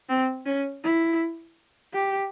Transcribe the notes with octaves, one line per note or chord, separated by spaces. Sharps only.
C4
C#4
E4
G4